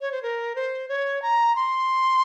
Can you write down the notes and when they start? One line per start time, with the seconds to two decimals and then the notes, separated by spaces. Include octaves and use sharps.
0.01 C#5
0.12 C5
0.23 A#4
0.55 C5
0.89 C#5
1.22 A#5
1.56 C6